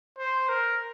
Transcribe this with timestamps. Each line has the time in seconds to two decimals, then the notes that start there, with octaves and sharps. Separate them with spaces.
0.18 C5
0.49 A#4